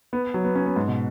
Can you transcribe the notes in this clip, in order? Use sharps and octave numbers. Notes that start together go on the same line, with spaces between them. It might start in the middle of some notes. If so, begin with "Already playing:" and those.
B3
F#3
B3
C#4
B3
G#2
B2